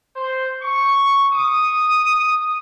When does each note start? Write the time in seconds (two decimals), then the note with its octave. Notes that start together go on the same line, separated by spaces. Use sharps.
0.16 C5
0.62 C#6
1.33 D#6